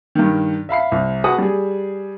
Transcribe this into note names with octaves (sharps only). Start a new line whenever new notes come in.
G2 D#3
E5 F5 B5 C7
C2
F#4 G#4 B4 F#5 A5 D#6
G3 G#4